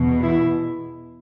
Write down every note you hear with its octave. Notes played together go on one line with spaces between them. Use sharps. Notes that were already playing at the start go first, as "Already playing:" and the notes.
Already playing: E2 B2
E4